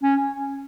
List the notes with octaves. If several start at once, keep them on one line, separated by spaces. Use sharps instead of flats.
C#4